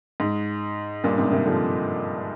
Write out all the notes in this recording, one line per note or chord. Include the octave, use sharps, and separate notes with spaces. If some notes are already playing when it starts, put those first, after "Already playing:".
G#2
G2 A#2
G#2 C3
C3 D#3
D3 F3